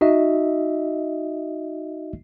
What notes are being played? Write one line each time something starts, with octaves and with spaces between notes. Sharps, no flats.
D#4 F#4 D#5 E5